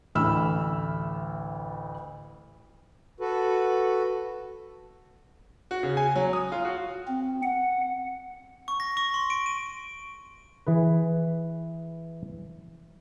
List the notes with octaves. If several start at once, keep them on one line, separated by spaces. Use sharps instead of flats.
A1 D2 B5 E6 F6
F#4 A4 B4
F#4
C#3
G#5
F#3
D#6
F4
F#4
C4
F#5
C#6
A#6
C#6
C6
D7
D#7
E3 G#4 B4